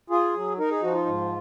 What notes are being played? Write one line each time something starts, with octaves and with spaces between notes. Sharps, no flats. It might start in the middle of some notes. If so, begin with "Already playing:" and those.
F4 G#4
F#3
D#4 A#4
G#4
F3 F#4
F4
G#2